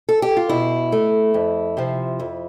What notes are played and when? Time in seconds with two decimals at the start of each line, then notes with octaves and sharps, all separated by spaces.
0.09 A4
0.22 G4
0.37 F4
0.49 B2 E4
0.92 A3
1.34 F2
1.77 C3 F3
2.20 F2